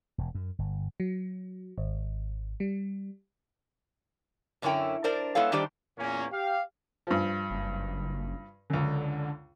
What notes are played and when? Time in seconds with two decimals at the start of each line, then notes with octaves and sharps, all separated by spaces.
0.18 E1
0.35 F#2
0.59 G1
1.00 F#3
1.78 G#1
2.60 G3
4.62 F#2 D3 C#4 E4 A#4 G5
5.04 D4 A#4 C5 D5
5.35 G#3 B3 E4 A4 C#5 F5
5.52 D#3 G3 D4 G4 C5 D5
5.98 E2 A#2 A#3 C#4
6.31 G4 F5
7.07 G2 F3
7.51 F#1
8.70 C#2 F#2 D3